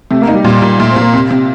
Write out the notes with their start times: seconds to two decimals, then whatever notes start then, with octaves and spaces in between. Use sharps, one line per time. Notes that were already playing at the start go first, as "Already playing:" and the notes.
0.11 C3 A3
0.22 A#3
0.27 D#4
0.34 G3
0.44 A#2 G3
0.62 A#2
0.79 A#2 A3
0.90 C4
0.96 A#2
1.02 A#3
1.14 C3
1.31 C3